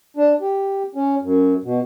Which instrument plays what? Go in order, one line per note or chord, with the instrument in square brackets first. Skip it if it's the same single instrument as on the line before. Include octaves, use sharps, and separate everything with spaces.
[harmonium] D4
G4
C#4
F#2
B2